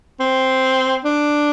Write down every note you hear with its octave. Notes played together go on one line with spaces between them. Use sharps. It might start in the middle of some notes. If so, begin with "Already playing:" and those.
C4
D4